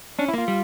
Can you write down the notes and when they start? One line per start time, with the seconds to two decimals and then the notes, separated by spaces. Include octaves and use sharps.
0.19 C#4 D4
0.28 E4
0.34 A#3 F4
0.48 G3